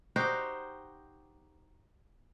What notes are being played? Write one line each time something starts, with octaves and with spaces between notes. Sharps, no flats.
D#4 F#4 G4 C5